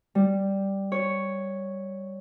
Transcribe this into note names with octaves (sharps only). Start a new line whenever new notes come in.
G3
C#5